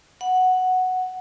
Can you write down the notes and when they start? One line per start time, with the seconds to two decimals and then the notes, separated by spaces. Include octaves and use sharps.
0.21 F#5